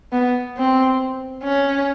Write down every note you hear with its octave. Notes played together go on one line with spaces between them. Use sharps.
B3
C4
C#4